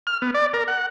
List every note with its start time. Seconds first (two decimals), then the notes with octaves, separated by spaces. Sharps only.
0.07 F6
0.22 B3
0.34 D5
0.53 A#4
0.68 F#5